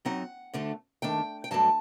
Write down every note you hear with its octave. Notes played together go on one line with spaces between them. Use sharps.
F#2 F#3 C4 D#4 F#5
D2 D3 A3 D4
D#2 D#3 A3 D4 G5
G5
G2 F#3 A3 D4 A5